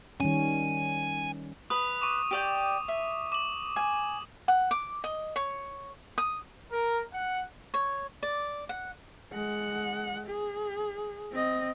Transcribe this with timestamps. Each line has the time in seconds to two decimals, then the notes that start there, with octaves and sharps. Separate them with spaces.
0.20 D#3 G3 C#4 G#5
1.70 B4 D#6
2.02 C#6 D6
2.31 G4 D5 G5
2.88 E5
3.32 D6 F#7
3.76 G#5
4.48 F#5
4.71 D6
5.04 D#5
5.36 C#5
6.18 D#6
6.73 A#4
7.14 F#5
7.74 C#5
8.23 D5
8.69 F#5
9.32 G#3 F#5
10.26 G#4
11.31 C4 D#5